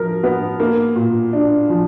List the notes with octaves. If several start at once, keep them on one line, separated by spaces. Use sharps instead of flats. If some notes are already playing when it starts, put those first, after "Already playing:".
Already playing: F3 A#4
B3
A#3
A#2
D4
F3